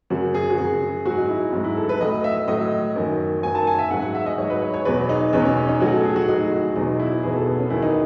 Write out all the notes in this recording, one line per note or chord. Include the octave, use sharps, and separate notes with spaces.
F#2 C#3 F#3 F#4
G#4
F#4
F#2 C#3 F#3 G#4
G#2 F#3 F#4
D#4
E4
G#2 F#3
E4
A4
B4
A2 F#3 D#5
E5
A2 F#3 D#5
F#2 D#3 F#3
F#2 D#3 F#3 G#5
A5
G#5
E5
G#2 F#3 F#5
F#5
E5
D#5
G#2 F#3 C#5
B4
C#5
C#5
E2 B2 F#3 B4
D#4
E2 B2 F#3 C#4
C#4
C#4
D#4
A2 F#3 F#4
A4
G#4
F#4
A2 F#3 D#4
F#4
E2 B2 F#3 D#4
E4
E2 B2 F#3 G#4
A4
B3
C#4
E2 D#3 F#3 E4
D#4